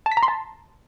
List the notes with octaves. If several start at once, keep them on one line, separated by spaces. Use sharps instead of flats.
A5
B6
A#5
C6
A5